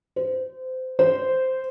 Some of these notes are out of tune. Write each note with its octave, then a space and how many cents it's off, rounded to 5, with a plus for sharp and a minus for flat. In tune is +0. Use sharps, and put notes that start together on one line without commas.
C5 -25
C5 -10